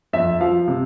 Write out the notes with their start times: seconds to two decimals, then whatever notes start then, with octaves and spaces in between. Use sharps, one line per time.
0.13 F2 E5
0.41 F3 F5
0.68 C3